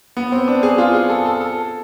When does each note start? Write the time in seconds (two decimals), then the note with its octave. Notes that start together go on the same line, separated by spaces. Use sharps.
0.17 B3
0.32 C4
0.48 D4
0.63 G#4
0.78 F4
0.94 G#4
1.09 A4
1.25 A4
1.41 A4